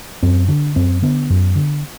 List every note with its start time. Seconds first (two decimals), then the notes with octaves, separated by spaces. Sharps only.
0.23 F#2 C4
0.48 D3 D4
0.76 F#2 C4
1.02 D3 B3
1.30 F#2
1.56 D3